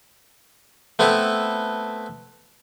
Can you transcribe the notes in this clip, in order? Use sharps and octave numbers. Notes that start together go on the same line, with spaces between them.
A3 B3 C4 E4 A4 B4